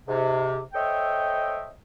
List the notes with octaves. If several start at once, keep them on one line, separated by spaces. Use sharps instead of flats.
G#2 C3
A4 C5 C#5 D#5 E5 G5